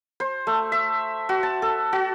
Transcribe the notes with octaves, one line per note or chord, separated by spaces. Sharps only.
C5
A3
E5
F#4
A5
A4
F#4